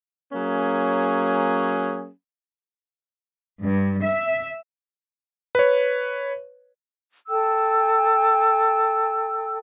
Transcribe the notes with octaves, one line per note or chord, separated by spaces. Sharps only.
F#3 A#3 C#4 G#4
G2
E5
B4 C#5
A4 G5 E6